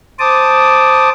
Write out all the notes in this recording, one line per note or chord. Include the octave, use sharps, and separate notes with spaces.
C5 A5 D6 D#6